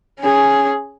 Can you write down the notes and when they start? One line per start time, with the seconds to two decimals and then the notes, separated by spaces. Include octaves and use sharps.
0.21 C#4 G#4